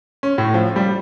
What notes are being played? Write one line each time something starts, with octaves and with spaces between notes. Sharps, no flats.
C#4
A2
F3
G3